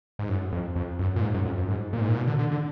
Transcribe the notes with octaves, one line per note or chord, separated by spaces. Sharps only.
G#2
F#2
F2
F2
F#2
A#2
G#2
F#2
F2
F#2
G#2
A#2
G#2
A#2
B2
D3
D3
D3